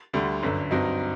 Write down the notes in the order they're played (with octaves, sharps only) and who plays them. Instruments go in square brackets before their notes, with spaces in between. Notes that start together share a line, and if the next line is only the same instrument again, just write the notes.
[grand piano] D2 D3 G3
G1 F#2 D3
G2 F#3 C4 D#4